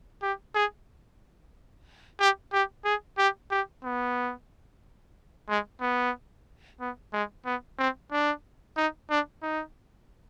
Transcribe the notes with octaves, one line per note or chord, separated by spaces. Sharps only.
G4
G#4
G4
G4
G#4
G4
G4
B3
G#3
B3
B3
G#3
B3
C4
D4
D#4
D4
D#4